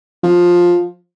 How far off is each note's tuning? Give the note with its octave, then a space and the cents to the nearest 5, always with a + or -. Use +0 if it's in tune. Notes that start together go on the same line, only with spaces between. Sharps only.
F3 +10